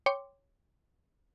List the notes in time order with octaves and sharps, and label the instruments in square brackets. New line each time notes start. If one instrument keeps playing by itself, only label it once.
[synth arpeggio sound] C#5 G5 C6 D6